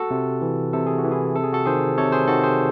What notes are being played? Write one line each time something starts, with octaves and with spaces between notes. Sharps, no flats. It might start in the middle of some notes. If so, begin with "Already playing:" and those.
Already playing: F#4 A4
C3
E3
C3 A4
G#4
F#4
E3
E4 G#4
C3 A4
G#4
F#4 A4
D#3 G#4 C5
C3 A4 C#5
G#4 C5
D#3 F#4 A4
G#4 C5